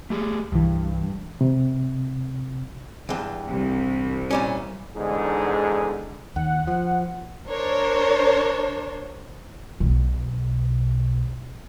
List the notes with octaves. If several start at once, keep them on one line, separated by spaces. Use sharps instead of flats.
A3 G4 G#4
C2 G2 E3
C3
E2 G2
C2
A#2 G3 C#4
E2 G#2 D3 G3 D#4 G#4
D#2 F#5
F3
D4 A#4 C5 C#5
B1 B2